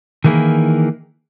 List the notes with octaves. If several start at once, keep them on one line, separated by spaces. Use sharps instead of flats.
D#3 E3 A#3 E4 G#4